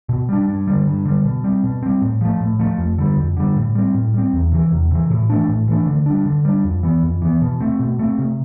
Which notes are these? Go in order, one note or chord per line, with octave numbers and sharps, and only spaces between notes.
B2
G3 D4
G2
D3 G3
G2
D3 G3
B2
G3 C4
B2
G3 C4
A2
F3 A3
A2
F3 A3
F2
D3 G3
F2
D3 G3
A2
G3 C4
A2
G3 C4
E2
C3 E3
E2
C3 E3
A2
E3 A3 D4
A2
E3 A3 D4
D3
G3 D4
D3
G3 D4
F2
E3 B3
F2
E3 B3
B2
A3 C4
B2
A3 C4
C3